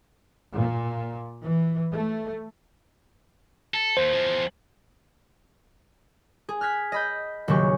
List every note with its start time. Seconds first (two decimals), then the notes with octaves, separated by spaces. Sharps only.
0.54 A#2
1.41 E3
1.91 A3
3.74 A4
3.97 D#2 C5
4.13 E2 F3
6.49 G#4
6.61 F6 F#6 G#6 B6
6.92 D#5 B5 G6
7.48 D#1 C#3 F#3 G4 C#6